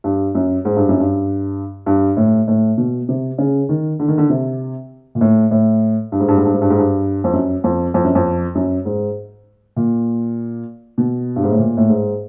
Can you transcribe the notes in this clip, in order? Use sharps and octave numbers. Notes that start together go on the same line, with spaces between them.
G2
F#2
G#2
G2
F#2
G2
G2
A2
A2
B2
C3
C#3
D#3
D3
D#3
D3
C3
A#2
A2
A2
G2
G#2
G2
G#2
G2
G#2
G2
G#2
G2
F2
F#2
F2
F2
F#2
F2
F#2
G#2
A#2
B2
G2
G#2
A2
A#2
A2
G#2